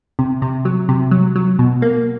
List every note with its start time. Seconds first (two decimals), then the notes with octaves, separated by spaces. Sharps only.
0.19 C3
0.42 C3
0.65 F#3
0.89 C3
1.11 F#3
1.36 F#3
1.59 B2
1.82 A#3